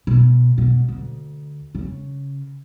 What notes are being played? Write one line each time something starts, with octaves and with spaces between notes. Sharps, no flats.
B2
B2
D2
C#3